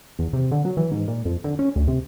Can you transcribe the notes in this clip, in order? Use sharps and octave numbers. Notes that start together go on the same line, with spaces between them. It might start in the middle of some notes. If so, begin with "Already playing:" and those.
E2
C3
D3
F#3
E3
G#2
A#2
F2
D3
C#4
D2
C3